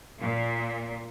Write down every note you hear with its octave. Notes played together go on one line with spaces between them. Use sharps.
A#2